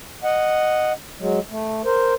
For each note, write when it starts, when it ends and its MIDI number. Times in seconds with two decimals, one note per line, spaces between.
0.24 0.92 75
0.24 0.92 78
1.20 1.39 54
1.20 1.39 56
1.50 1.82 57
1.85 2.14 70
1.85 2.14 72